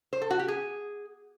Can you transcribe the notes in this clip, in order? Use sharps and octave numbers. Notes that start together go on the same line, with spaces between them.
C5
A4
F#4
G4
G#4